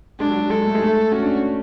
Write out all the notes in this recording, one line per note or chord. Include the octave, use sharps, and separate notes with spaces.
G#3 D4
F#3
F#3
G#3 A4
A3
G#3
A3
C#4 F#4
D4
C#4